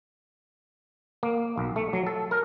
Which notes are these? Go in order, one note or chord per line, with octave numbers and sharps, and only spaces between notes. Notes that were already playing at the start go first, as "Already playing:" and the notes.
A#3
B1
A3
F#3
A4
A#4